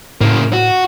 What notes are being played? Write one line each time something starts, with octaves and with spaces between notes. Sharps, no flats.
A2 C#3 A#3
F#4